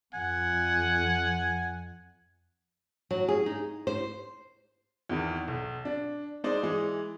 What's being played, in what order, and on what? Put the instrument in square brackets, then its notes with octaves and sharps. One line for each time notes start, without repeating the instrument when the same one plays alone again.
[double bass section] F2 [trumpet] F#5 [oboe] G#5
[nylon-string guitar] F#3
G#4
D#4
C5
[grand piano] E2 D#3 E3
B1
D4
G#3 D#4 C5 D5
E3 G#3